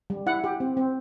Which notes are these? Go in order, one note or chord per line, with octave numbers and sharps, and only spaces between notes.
G3
E4 F#5
G4
C4
C4